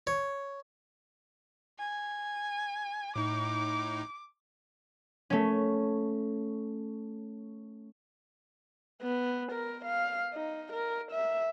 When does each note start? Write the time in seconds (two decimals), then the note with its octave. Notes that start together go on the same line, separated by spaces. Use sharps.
0.07 C#5
1.79 G#5
3.16 A2 D#4 D6
5.30 A3 C#4
9.02 B3
9.52 A#4
9.85 F5
10.34 D#4
10.73 A#4
11.12 E5